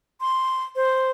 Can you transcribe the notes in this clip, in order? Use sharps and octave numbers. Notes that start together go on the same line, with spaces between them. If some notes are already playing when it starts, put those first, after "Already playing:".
C6
C5